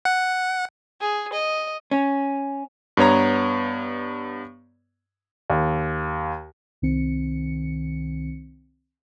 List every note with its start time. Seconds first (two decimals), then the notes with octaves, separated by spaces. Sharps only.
0.05 F#5
1.01 G#4
1.33 D#5
1.91 C#4
2.97 G2 B3 C#5 A#5
5.50 D#2
6.82 C2 D#3 C4 C#7